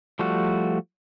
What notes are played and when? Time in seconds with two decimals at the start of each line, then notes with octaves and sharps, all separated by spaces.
0.19 F3 G3 A3 F#4